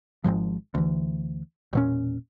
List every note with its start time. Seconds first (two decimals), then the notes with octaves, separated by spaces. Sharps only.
0.24 G#1 C#2 G#2 F3
0.75 D2 E3
1.73 E1 A#2 C#4